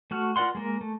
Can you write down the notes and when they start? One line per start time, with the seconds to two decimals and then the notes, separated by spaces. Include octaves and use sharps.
0.11 A3 F#4 F6
0.36 F4 A#4 D5 F#5 C6
0.55 G#3 A#3 A#4
0.81 A3